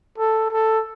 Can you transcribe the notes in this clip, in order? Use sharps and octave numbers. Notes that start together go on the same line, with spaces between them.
A4
A4